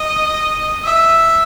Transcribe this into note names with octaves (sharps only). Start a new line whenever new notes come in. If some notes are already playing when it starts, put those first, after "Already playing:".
Already playing: D#5
E5